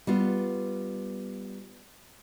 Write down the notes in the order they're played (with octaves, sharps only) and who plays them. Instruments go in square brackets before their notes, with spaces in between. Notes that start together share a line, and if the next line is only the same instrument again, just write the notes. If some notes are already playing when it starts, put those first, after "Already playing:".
[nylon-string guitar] G3 B3 F4